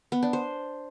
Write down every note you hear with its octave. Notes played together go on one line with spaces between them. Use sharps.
B3
D4
C5